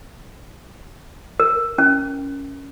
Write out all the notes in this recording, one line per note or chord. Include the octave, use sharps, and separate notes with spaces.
A#4
C#4